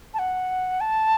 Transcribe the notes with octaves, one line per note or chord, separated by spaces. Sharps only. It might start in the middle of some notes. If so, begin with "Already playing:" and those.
A5
F#5
A5